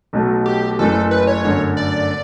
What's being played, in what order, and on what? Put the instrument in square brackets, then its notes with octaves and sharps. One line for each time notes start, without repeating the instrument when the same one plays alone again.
[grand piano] B1 B2 F#3 A3
[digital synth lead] G4
[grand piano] F#1 F#2 E3 A3 [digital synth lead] A4
[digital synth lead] B4
C#5
[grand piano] G1 F#2 D3 A3
[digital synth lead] D5